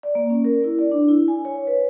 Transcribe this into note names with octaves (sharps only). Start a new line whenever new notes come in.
D5
A#3
C#4
A#4
E4
D5
D4
E4
G#5
C#5
B4